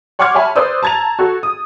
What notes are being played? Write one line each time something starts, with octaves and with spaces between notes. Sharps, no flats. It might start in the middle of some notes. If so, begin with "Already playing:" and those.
C#5 F#5 C6 D6 F6 G#6
C#5 E5 G#5 A5 B5
B4 C5 D5 D#6 E6
A5 A#5 G#6 A6 F7
F#4 A4
D#6